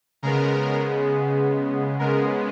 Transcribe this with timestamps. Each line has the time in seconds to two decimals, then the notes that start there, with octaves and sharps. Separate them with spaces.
0.23 C#3 G#3 B3 A#4
1.99 C#3 G#3 B3 A#4